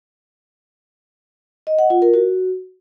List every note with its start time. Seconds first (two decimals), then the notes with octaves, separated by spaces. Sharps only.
1.67 D#5
1.79 F#5
1.90 F4
2.02 A#4
2.14 F#4